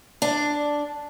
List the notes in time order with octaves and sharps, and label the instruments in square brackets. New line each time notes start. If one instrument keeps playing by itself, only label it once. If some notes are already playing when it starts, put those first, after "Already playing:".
[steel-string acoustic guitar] D4